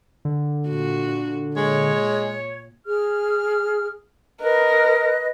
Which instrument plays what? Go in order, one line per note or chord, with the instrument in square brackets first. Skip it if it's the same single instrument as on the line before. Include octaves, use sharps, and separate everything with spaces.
[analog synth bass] D3
[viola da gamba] A#2 F#4
[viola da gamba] A#2 [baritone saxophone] G#3 [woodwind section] C#5
[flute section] G#4 F6
[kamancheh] A#4 [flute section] B4 D#5 F#6